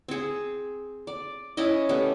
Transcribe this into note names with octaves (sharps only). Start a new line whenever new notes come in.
C4 G#4
D5
C#4 E4 D5 D#5
G3 A3 B3 C#4